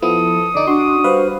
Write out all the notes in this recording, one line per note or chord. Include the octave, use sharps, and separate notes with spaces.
F3 B3 E4 A4 D#6
D3 D#4 D5
D4 F#4 C6 D6
G3 B4 C5 F5